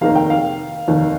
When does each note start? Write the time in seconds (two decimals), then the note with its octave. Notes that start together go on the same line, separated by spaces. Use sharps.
0.01 F1 D#2 D#3 A#3 F5
0.15 G5
0.30 F5
0.88 F1 D#2 D#3